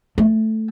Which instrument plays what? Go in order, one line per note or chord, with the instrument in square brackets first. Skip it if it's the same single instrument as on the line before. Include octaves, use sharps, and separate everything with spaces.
[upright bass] A3